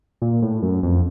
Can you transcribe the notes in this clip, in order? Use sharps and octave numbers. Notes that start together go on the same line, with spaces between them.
A#2
A2
F#2
F2